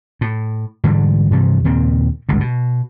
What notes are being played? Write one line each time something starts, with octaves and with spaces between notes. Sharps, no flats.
A2
G#2 D3 E3 G3
G2 C3 E3 F3
D#2 A#2 C#3 C4
G1 C#2 G#2
B2